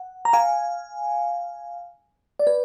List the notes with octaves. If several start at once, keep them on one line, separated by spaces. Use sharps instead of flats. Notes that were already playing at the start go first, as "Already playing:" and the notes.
Already playing: F#5
A#5
F5 G#5
D5
B4